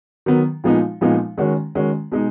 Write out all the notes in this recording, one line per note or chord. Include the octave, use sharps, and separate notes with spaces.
D#3 F#3 B3
A#2 F3 G#3 B3 D#4
A#2 F3 G#3 B3 D#4
D#3 G#3 C#4 F#4
D#3 G#3 C#4 F#4
B2 G#3 D#4